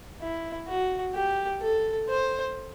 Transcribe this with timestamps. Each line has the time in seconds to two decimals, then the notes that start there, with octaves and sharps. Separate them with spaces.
0.20 E4
0.68 F#4
1.14 G4
1.61 A4
2.09 C5